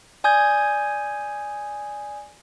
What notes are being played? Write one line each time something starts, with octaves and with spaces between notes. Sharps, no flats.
D5 G#5 D#6 G6 G#6